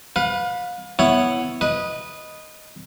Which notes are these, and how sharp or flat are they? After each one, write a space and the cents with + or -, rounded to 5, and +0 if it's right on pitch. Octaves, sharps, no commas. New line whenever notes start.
B4 -5 F5 +35
B3 +0 E4 +0 C#5 +0
B4 -15 D#5 +0